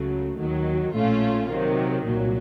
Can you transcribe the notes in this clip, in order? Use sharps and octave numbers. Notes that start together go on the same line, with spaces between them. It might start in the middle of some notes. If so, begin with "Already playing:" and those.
Already playing: C#2 C#3 F#3 A3
D#2 D#3 F#3
A#1 A2 A3 C#4 F4
C3 D#3 F#3
C2 A#2 F#3